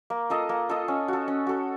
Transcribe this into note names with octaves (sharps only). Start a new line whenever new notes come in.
A#3
F4 A4 D#5
A#3
F4 A4 D#5
C#4
F#4 A4
C#4
F#4 A4